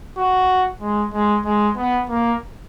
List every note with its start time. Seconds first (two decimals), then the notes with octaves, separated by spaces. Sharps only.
0.17 F#4
0.81 G#3
1.13 G#3
1.45 G#3
1.77 B3
2.09 A#3